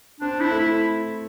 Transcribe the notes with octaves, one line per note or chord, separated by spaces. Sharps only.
C4 D4
E4
A3
E4